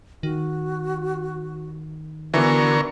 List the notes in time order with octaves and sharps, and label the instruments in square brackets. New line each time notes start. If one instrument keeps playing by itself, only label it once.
[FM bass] D#3 [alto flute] F#4
[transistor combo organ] D3 A#4 C#6 [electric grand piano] E3 B3 [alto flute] F#4